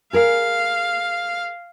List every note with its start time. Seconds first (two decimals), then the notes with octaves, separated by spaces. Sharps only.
0.13 G#4 A#4 F5